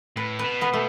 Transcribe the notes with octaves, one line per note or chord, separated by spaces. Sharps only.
A2 B4
B4
B2
B3 B4
B2 A3